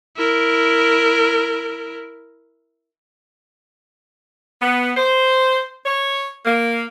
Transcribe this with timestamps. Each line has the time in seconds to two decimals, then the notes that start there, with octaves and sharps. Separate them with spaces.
0.17 E4 A#4
4.61 B3
4.97 C5
5.85 C#5
6.46 A#3